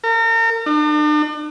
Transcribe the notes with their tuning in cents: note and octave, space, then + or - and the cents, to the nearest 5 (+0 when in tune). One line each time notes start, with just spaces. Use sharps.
A#4 -35
D4 +45